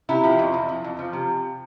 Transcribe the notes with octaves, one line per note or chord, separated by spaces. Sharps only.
C3 E4
F3
F2
F2
F3
F2
F3
C3